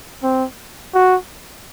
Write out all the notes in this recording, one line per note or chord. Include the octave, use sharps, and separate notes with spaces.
C4
F#4